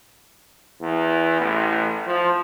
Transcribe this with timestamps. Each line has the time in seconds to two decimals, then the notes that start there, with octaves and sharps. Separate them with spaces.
0.81 E2
1.40 A1
2.07 F3